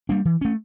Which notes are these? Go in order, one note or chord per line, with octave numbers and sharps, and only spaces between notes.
G3 A#3 D4
E3
A3 C#4